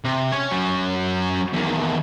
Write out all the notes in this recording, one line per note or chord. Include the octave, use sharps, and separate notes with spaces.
C3
C#4 C#5
F#3 C#4
E2 D#3